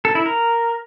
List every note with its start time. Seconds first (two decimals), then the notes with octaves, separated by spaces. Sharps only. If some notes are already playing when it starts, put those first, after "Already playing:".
0.05 A4
0.15 E4
0.26 A#4